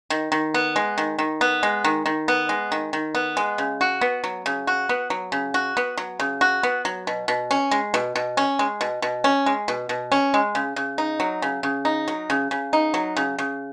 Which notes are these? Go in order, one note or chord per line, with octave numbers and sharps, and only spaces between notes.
D#3
D#3
B3
G#3
D#3
D#3
B3
G#3
D#3
D#3
B3
G#3
D#3
D#3
B3
G#3
C#3
F#4
B3
F#3
C#3
F#4
B3
F#3
C#3
F#4
B3
F#3
C#3
F#4
B3
F#3
B2
B2
C#4
G#3
B2
B2
C#4
G#3
B2
B2
C#4
G#3
B2
B2
C#4
G#3
C#3
C#3
D#4
F#3
C#3
C#3
D#4
F#3
C#3
C#3
D#4
F#3
C#3
C#3